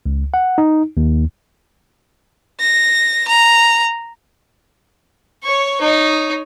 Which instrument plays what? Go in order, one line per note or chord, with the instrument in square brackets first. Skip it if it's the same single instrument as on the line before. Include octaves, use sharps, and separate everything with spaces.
[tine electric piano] C#2
F#5
D#4
D#2
[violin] A#6
A#5
[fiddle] C#5 C#6
D#4 C#5